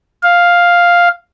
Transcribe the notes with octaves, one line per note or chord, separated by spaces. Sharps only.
F5